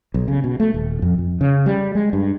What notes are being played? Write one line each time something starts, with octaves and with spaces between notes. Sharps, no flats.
B1
C#3
B2
A3
D#1
F2
F2
C#3
G3
G#3
G2